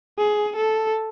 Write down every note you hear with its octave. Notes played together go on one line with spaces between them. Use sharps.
G#4
A4